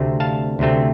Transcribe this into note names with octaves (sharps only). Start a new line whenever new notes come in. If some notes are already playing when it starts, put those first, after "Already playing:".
Already playing: D2 C3 A3 C4
F5 A5
D2 C3 A3 C4